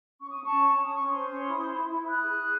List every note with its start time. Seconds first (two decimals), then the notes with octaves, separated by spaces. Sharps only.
0.20 C#4 C#6
0.31 C#4 D#6
0.43 A5 C#6
0.51 C#4
0.67 C#4
0.82 C#4 D#6
0.95 C#4 C#6
1.07 C6 D#6
1.13 C5
1.28 C#4
1.44 E4
1.60 C5
1.75 E4
1.91 E4
2.06 E4 D#6 F#6
2.21 G#4
2.37 G#4